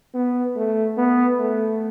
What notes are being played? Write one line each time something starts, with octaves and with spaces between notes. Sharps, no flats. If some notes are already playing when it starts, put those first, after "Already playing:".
B3
A3
B3
A3